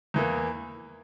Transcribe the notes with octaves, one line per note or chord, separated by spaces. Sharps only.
E2 E3 A#3